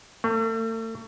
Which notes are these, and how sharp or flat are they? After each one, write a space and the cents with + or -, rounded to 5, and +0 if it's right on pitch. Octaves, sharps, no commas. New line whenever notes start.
A3 +40